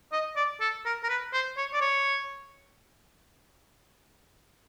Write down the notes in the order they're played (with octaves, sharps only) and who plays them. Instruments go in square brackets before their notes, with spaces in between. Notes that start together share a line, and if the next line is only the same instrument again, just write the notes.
[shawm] D#5
D5
A4
A#4
A#4
B4
C5
C#5
D5
C#5